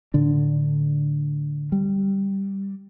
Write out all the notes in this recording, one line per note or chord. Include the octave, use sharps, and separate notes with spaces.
A2 D3 D4
G3